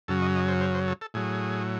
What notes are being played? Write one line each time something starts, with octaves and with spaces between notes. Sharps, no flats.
F#2 C#3 F#3 A4
D#5
D#5
C5
C5
C5
A4
A4
A2 F#3 G#4